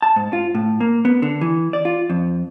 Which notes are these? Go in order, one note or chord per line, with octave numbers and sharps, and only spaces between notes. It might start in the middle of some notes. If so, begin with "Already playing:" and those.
A5
G#2
F4
A2
A#3
B3
D3
E3
D5
F4
F2